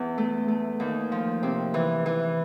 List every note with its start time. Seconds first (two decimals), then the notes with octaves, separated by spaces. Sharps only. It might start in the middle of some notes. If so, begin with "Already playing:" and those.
Already playing: E2
0.18 A3
0.48 A3
0.80 D#2
1.12 F3
1.43 C3
1.74 E3
2.06 E3